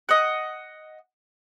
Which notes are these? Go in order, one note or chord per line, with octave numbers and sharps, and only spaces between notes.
D#5 F#5